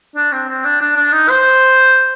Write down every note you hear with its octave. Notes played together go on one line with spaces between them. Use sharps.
D4
C4
C4
D4
D4
D4
D#4
C5